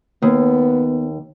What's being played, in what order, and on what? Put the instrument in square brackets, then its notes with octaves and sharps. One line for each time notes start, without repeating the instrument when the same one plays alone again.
[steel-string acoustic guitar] D#2 [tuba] B3